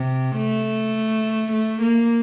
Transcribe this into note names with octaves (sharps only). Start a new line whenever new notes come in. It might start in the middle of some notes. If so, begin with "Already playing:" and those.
Already playing: C3
A3
A3
A#3